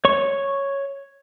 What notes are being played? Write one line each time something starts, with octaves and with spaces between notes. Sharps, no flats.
C#5 C#6